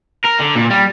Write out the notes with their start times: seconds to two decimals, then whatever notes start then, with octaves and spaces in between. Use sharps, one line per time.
0.25 A#4
0.40 D3
0.56 A#2
0.71 G3